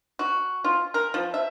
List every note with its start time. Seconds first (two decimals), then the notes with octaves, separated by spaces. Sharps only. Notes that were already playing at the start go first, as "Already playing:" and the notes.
0.19 F#4
0.64 F4
0.94 A#4
1.14 F3
1.34 E5